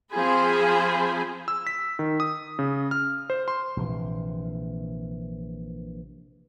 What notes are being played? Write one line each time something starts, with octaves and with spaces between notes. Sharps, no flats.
F3 C4 G#4 C5 G#5 B5
E6
B6
D#3
D#6
C#3
F6
C5
C6
A#1 C3 E3